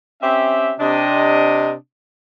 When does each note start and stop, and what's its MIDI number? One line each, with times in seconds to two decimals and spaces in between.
0.22 0.74 60
0.22 0.74 61
0.22 0.74 67
0.22 0.74 76
0.80 1.73 48
0.80 1.73 62
0.80 1.73 75